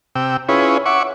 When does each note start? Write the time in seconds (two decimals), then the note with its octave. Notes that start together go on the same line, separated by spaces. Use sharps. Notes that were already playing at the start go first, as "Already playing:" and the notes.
0.15 C3 G5 E6
0.49 C#4 E4 F4 G#4 B4 C#5
0.86 C#5 E5 F#5 C#6 D6